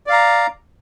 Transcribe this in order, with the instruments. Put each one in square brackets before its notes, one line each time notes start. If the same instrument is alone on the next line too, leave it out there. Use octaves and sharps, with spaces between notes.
[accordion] D5
F5
A#5